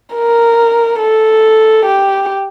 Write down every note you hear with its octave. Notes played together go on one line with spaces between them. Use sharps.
A#4
A4
G4